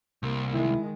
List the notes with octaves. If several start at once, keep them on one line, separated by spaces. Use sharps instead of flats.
C2 A#3
D#3 G#3 E4